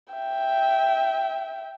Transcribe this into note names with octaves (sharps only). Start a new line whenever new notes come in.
E5 G5